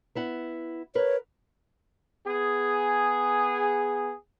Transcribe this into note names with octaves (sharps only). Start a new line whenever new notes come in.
B3 E4 F#5
A#4 B4 C#5
B3 G#4